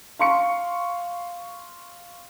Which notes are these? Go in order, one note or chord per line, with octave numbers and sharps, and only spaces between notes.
F5 C6 C#6 C#7